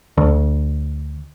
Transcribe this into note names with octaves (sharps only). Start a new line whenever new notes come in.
D2